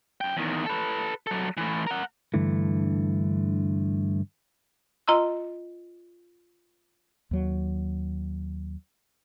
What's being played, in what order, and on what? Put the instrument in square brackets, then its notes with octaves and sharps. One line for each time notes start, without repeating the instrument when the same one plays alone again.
[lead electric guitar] F#2 G5
E2 D#3
A4 B4
F#3 A4
A2 E3
A#4 F#5
[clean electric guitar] G2 D3 E3 A3
[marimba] F4 D#5 A#5 C6 E6
[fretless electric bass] D#2 F#3